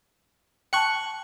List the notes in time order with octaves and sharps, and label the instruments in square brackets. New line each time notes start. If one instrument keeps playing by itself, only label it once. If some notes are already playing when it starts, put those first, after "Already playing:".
[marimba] G5 A5 [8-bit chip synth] C#6 F#6 C#7